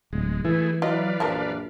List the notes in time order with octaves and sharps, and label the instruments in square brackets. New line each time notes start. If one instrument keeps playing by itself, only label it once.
[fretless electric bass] D1 [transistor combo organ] G#3
[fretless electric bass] E3 [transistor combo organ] A3 E4 G#4
[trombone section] F#3 E4 [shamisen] F4 D#5 [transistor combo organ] B4 D5 F5
[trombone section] A#1 F#2 [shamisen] F3 A4 A#4